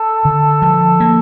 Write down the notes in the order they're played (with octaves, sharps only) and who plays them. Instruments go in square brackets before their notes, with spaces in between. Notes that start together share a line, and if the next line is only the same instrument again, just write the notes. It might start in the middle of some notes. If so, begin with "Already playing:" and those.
Already playing: [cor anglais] A4
[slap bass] D3
F3
A#3